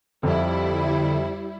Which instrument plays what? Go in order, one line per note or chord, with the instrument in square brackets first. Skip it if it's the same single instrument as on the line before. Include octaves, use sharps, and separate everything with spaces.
[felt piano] F2 [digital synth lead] D3 [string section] G3 E4